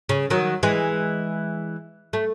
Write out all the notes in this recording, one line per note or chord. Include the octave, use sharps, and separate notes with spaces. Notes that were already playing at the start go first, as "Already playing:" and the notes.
C#3
D#3 F#3
E3 G#3
A3